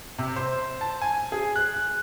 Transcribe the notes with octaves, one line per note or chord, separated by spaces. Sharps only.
C3
C5
A5
G#5
G#4
F#6